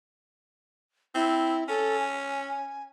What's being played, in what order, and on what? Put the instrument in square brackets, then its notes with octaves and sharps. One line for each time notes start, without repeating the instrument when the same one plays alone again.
[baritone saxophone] C4 [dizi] E4
[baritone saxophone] C#4 [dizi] A4
[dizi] G#5